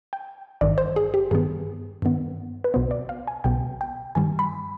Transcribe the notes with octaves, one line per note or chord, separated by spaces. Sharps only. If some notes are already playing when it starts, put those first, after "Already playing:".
G5
G#1 G2 D#3 D5
C5
G#4
G4
G2 D#3 B3 G#4
G2 D#3 B3
B4
B1 B2 B3 C5
D5
F5
G#5
B1 B2 B3 G5
G5
G2 D#3 G3 G#5
B5